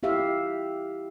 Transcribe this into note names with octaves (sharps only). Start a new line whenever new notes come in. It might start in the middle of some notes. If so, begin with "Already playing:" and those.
E4 G4 E5 F5